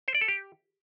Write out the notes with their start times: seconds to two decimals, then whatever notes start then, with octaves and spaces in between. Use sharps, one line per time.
0.08 C5
0.15 D5
0.21 A4
0.28 G4